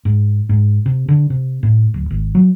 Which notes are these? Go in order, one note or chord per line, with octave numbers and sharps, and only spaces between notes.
G#2
G#2
C3
D3
C3
A2
D1
G#1
F#3